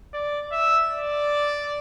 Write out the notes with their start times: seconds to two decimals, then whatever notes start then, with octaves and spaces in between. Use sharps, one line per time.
0.14 D5
0.52 E5
0.90 D5